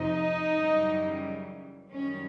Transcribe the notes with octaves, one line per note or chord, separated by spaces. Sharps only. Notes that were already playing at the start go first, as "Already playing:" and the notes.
Already playing: F2 C3 F3 D#4
F#2 C#3 E3 G3
F#2 D#3 G3 C#4